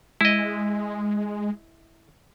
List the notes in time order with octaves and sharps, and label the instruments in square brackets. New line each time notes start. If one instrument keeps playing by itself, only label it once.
[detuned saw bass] G#3 [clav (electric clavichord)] E4 D#5